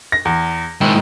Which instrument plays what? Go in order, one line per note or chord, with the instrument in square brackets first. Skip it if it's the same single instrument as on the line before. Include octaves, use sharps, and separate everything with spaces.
[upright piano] A#6
E2
[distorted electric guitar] G#2 E4 [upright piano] D#3